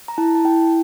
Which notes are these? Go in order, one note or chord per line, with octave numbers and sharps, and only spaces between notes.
A#5
E4 A5
A5
E4 G5